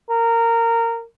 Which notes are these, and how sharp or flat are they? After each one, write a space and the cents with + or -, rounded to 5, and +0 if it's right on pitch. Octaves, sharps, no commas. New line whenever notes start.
A#4 -15